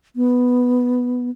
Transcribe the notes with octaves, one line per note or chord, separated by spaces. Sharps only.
B3